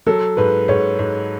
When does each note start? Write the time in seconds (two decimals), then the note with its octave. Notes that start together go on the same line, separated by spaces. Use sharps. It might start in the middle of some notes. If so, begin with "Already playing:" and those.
0.07 F#3 A4
0.37 G#2 B4
0.68 G#2 C#5
0.99 G#2